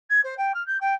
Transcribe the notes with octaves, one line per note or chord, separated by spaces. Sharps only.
G#6
C5
G5
F6
G6
G5